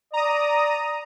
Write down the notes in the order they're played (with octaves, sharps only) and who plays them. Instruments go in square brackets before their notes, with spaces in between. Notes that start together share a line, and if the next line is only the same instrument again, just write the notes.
[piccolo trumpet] D5 [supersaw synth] A#5 D#6